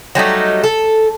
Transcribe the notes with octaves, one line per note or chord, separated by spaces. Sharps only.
F#3 G3 A3 D#4
A4